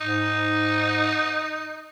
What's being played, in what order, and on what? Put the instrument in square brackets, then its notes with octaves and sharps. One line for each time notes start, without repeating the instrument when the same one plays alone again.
[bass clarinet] G#2 [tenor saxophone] D#4